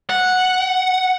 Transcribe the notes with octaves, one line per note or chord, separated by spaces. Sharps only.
F#5